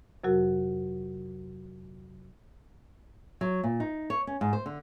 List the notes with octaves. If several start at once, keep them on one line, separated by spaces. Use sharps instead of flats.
F2 C3 F#3 F#4 A#4
F#3
A#2
D#4
C#5
C#4
G#2
C5
D3